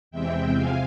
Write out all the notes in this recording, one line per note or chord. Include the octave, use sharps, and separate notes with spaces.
E2 C3 E3 G#3 C4 E5 G5
C3 F3 F5 G#5